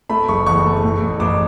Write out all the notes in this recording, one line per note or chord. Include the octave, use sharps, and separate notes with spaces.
A3 B5
F#1 C#6
E2 C#6
A3
A2
A1
A1 D6